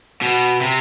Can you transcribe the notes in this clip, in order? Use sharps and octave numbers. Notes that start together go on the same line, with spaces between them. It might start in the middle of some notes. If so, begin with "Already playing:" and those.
B2
C3